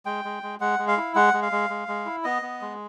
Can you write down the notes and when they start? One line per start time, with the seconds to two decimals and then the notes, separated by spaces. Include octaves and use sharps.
0.06 G#3 G5
0.25 G#3
0.43 G#3
0.60 G#3 F#5
0.79 G#3
0.88 F5
0.97 E4
1.15 G#3 F#5
1.34 G#3
1.42 F5
1.52 G#3
1.70 G#3
1.88 G#3
2.06 E4
2.24 B3 D#5
2.42 B3
2.61 G#3